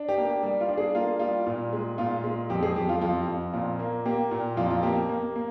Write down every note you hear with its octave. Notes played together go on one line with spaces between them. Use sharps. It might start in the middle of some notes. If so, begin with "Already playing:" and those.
Already playing: D4
G4
A#3
G4
G3
F4
D4
G#4
A#3 F4
G3 F4
A#2
G#3
A#2 F4
G#3
F2 G4
G#4
F2 G4
F4
F2 F4
F2
A#2 F4
A#3
A#3 G4
A#2
F2 F4
F4
A#3 G4
A#3
A#3